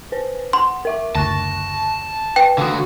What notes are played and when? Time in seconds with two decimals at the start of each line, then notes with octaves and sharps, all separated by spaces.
0.12 B4 C5
0.53 F#5 C6
0.85 A#4 E5 D6
1.15 F#1 D2 A5 C#6 F#6 A#6
2.36 B4 G5
2.58 D3 F#4 F5 D#6